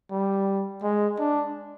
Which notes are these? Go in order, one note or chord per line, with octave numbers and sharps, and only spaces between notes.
G3
G#3
D4